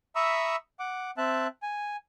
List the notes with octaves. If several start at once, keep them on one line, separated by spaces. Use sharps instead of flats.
E5 A#5 B5 C#6 D#6 E6
F#5 D6
C4 E5 A5 F#6
G#5